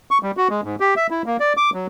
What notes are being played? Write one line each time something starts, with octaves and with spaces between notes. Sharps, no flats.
C#6
G3
F#4
G#3
G#2
G4
E5
E4
A#3
D5
D6
F#3